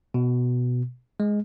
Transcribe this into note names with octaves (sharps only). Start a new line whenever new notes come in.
B2
G#3